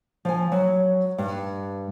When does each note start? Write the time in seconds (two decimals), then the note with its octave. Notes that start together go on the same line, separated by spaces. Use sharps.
0.25 F3 G#5
0.52 F#3
1.18 G2